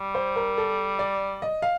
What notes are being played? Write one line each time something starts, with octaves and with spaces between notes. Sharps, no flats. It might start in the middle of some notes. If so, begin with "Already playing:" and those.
Already playing: G3
C5
A#4
A4
D5
D#5
F5